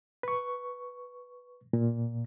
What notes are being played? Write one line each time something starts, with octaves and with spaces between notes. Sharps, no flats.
B4 C#6
A#2